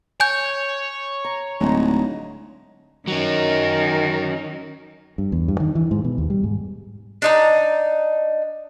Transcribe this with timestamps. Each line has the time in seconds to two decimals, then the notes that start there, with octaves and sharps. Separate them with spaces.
0.20 C#5 G#5 G6
1.24 A#5
1.60 D1 F#3 G#3 D#4
3.08 D#3 F#3 C#4
5.18 G2
5.32 E2
5.48 G2
5.60 D#3
5.75 E3
5.91 G#2
6.04 B2
6.18 D#2
6.30 G3
6.44 G#2
7.22 D4 D#4 A#5